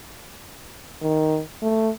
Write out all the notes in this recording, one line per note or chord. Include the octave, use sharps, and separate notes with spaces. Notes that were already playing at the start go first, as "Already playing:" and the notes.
D#3
A3